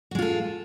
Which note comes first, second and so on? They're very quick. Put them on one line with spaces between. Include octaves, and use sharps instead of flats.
F#4 G#3 F4 A4